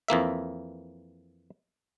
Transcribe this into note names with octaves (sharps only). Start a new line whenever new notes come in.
F2 E3 A#3 E5